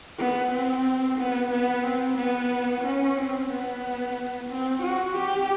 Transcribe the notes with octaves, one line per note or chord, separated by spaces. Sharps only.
B3
C4
B3
B3
C4
B3
C#4
C4
B3
C4
F#4
G4